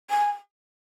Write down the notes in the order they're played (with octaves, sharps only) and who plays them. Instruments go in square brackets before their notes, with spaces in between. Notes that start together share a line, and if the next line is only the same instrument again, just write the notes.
[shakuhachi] G#5